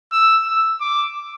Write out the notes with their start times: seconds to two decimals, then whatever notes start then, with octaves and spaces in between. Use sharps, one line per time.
0.12 E6
0.47 E6
0.81 D6